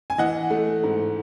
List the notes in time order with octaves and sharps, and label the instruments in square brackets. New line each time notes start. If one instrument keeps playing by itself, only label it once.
[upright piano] G#5
E3 D#5 F#5
A3
G#2